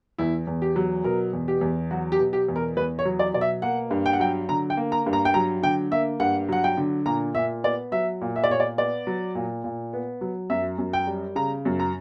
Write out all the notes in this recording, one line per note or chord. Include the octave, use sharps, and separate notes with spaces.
E2 E4
E2
G4
F#3
B2 A#4
E2
G4
E2
F#3 F#4
G4
B2
G4
E2
A#4
E2 B4
C#5
F#3
D5
B2 D5
E5
A#3 F#5
G2
G5
F#5
F#3 G5
D3 A#5
G5
A#3
A#5
G2
A#5
G5
F#3 A#5
D3 G5
A#3 E5
G2 F#5
F#3 F#5
G5
D3
A#2 A#5
A#2 E5
B3 D5
F#3 E5
A#2
E5
D5
A#2 C#5
D5
B3 D5
F#3
A#2
A#2
B3
F#3
F#2 E5
F#2
G5
G3
C#3 A#5
F#2
A#5